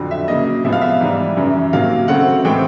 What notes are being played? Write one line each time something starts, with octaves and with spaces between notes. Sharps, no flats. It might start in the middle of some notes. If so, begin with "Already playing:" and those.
Already playing: F2 D3 F#3
E5
C#3 F#3 A#3 D#5
C3 F3 G#3 B3 E5
F5
E5
G#2 E3 G3
F#2 C#3 E3
C3 D#3 F#3 A#3 F5
C#3 F#3 A3 C4 F#5
A2 E3 G#3 C4 G5